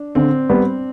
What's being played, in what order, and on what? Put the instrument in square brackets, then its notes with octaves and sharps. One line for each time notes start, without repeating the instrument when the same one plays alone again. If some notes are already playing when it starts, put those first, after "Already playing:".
Already playing: [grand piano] D4
[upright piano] D3 [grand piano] C4
[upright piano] G3 B3